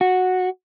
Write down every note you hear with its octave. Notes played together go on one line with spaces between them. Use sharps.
F#4